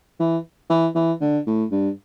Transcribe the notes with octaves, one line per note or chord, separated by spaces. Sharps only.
E3
E3
E3
D3
A2
G2